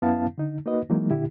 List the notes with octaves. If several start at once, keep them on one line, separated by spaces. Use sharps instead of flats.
F#2 B3 C#4 E4 F5 A5
D3 D#4
A#3 D#4 F#4 B4 D#5
E3 F#3 G#3 A#3 D#4
A#2 D3 E4 G4